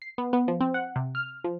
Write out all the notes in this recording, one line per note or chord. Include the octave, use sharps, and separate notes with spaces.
C7
B3
B3
F3
C4
F#5
C3
F6
F3